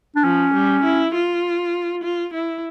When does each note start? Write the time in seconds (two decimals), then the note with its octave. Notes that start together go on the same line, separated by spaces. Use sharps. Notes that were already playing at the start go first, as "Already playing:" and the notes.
0.16 D4
0.24 F3 C#4
0.53 G3
0.83 E4
1.14 F4
2.03 F4
2.34 E4